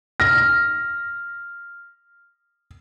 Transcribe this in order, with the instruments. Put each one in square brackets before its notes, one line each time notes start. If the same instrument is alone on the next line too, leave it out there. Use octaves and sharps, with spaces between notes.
[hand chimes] F6 [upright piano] A#6